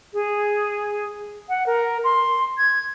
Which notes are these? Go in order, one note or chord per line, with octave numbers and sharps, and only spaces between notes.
G#4
F#5
A#4
C6
G#6